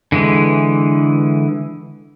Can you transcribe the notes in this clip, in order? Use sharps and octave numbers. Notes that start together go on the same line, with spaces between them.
D3 E3 G#3